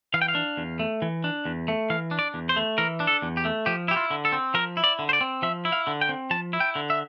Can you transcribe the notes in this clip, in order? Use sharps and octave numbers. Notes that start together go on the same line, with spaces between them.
E3 F5
G5
F5
D4
E2
A3
E3
D4
E2
A3
E3 F5
D4
D5
E2
C5
A3
E3 A#4
D4
A4
E2
G4
A3
F3 G4
E4 G4
F4
D3
A4
C4
F3 A#4
E4
D5
D3
C5
D5
C4
F3 E5
E4
F5
D3
G5
C4
F3 A5
E4
G5
D3
E5